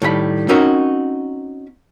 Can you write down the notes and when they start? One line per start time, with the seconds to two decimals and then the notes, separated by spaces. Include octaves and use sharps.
0.02 A2 D#3 G3 F#5 B5
0.49 C4 C#4 D#4 F#4 A#4 E5